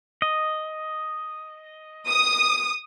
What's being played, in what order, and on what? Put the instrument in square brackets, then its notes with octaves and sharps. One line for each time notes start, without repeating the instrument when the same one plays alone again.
[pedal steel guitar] D#5
[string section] D#6